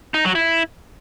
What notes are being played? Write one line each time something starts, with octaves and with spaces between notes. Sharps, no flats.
D#4
F#3
E4